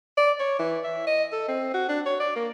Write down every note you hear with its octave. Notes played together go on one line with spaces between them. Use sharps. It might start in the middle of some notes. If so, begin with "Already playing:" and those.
D5
C#5
E3
E5
D#5
A4
C4
F#4
D4
C#5
D5
A#3